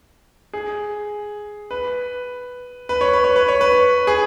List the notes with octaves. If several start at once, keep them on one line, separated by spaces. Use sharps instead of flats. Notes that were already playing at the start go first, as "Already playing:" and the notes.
G#4
B4
B4
C#5
B4
C#5
B4
C#5
B4
G#4